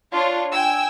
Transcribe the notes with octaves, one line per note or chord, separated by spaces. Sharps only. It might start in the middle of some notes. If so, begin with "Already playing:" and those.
D4 F4 C#5
G5 G#5 E6